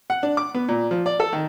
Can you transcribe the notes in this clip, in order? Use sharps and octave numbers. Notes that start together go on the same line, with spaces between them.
F#5
D4
D6
B3
A#2
F3
D5
A4
D#3